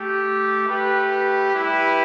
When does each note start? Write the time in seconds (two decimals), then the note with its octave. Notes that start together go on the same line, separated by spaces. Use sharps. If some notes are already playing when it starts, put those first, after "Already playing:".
Already playing: A3 G4
0.68 A3 G4 B4
1.10 B4
1.53 G3 E4 G4 B4